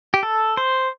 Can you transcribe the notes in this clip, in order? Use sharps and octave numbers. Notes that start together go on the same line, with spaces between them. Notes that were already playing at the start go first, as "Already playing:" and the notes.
G4
A4
C5